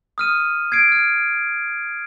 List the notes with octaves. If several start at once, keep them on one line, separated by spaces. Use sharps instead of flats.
D#6 F6 D#7
G#6 C7 D7
F6